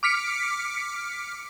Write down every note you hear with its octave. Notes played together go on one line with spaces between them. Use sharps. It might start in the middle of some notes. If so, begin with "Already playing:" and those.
D6 F6 B6 C#7 D7